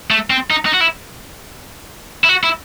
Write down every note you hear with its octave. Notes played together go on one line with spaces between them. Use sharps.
A3
C4
D#4
D#4
F#4
E4
E4
F#4
E4